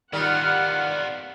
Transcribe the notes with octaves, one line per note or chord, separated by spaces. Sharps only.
D#3 G3 B3 F4 F#5 F6